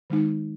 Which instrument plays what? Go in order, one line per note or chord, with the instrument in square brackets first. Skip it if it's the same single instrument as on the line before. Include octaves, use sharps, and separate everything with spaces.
[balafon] D#3 G#3 D#4